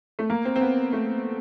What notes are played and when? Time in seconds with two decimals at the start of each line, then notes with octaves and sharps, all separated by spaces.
0.19 A3
0.30 A#3
0.45 C4
0.56 C4
0.61 B3
0.93 A3